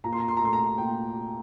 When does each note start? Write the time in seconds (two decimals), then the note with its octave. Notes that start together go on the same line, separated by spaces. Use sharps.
0.04 A#2 A#5
0.13 C6
0.20 A#5
0.28 C6
0.37 A#5
0.41 A3 C6
0.53 A#5
0.78 A#2 G5